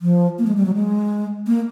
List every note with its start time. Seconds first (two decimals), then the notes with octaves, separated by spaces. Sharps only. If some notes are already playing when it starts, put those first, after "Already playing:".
0.02 F3
0.39 A#3
0.47 G#3
0.57 G3
0.66 F#3
0.74 G#3
1.47 A#3